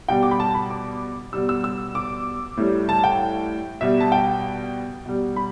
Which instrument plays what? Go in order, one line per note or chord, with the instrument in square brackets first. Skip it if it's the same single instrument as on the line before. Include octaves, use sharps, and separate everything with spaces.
[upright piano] B2 G3 G5
D6
B5
A5
B5
D6
B2 G3 E6
E6
E6
D6
A2 G3
A5
G5
B2 G3 E5
A5
G5
B2 G3
B5